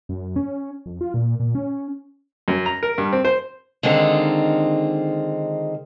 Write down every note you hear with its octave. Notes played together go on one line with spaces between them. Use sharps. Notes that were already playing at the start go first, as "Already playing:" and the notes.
F#2
C#4
F2
F4
A#2
A#2
C#4
F#2
A#5
A#4
G2
C4
C5
D3 D#3 G#3 C4 D#4 F4